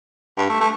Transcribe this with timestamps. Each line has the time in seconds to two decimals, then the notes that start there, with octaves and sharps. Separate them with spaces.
0.38 G2
0.49 A3
0.61 A3